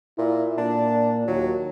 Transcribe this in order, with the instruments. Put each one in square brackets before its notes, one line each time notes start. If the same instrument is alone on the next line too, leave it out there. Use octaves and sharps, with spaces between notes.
[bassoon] A#2 [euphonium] E4
[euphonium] A#2 [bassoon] D4
[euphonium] D#2 [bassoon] F#3